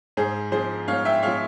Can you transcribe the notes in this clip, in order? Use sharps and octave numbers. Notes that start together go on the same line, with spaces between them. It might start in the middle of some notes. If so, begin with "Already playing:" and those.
G#2 G#4 C5
F3 G#3 G#4 C5
G#2 C#5 F5
E5 G5
F3 G#3 C#5 F5